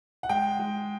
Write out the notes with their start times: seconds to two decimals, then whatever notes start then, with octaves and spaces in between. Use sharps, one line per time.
0.23 F#5
0.29 G#3 G5
0.59 G#3